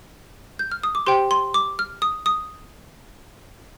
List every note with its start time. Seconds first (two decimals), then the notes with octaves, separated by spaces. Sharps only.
0.59 G6
0.72 F6
0.83 D#6
0.95 D6
1.06 G4 C5 G5 C6
1.31 C6
1.54 D6
1.79 F6
2.02 D#6
2.26 D#6